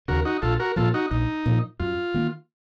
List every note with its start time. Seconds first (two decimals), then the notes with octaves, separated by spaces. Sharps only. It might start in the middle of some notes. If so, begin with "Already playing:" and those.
0.08 D#2 C#3 F#4 A#4
0.25 D#4 F#4
0.42 A#1 F4 A4
0.60 F#4 A#4
0.76 A#2 F3 F4 A4
0.94 D#4 F#4
1.11 A#1 D#4
1.46 A#2 F3
1.80 F#2 F4
2.14 D#3 A#3